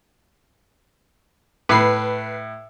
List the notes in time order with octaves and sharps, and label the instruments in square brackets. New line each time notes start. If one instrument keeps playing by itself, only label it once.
[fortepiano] A2 [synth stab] B4 C7